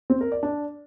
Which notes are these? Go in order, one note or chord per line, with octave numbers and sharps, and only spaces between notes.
C4
A#4
D5
D4